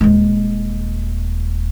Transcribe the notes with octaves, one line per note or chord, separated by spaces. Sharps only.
D#1 G#3